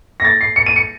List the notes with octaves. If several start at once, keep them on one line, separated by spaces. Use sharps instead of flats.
A#6
A6
C7
C#7
D#7
C#7